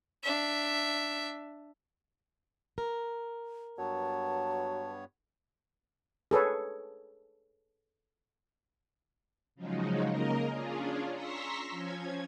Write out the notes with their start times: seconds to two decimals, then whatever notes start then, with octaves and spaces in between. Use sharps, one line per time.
0.23 D4 E5
2.78 A#4
3.78 G2 F#3 B3 C#5 A5
6.31 G#4 A4 B4 C#5
9.55 C#3 F3 F#3 G#3 D#4
10.07 C#3 A#3 A#4 D#5 A#5
10.50 C#4 D4 F4 G#4
11.13 A#5 C6 C#6 E6 A#6 B6
11.70 F3 C#4 G#6